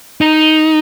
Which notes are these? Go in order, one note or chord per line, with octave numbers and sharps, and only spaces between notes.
D#4